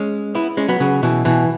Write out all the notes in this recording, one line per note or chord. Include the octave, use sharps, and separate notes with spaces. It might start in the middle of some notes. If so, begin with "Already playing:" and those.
Already playing: G#3 C#4
B3 E4
G#3 C#4
F#3 B3
C#3 F#3
B2 E3
B2 E3